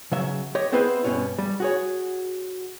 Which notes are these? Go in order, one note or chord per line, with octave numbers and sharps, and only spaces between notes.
C#3 F#3 E5
G4 C#5 D#5
B3 C4 E4 G#4 B4 C5
G2 B2 B3 C#4
G3
F#4 G#4 C#5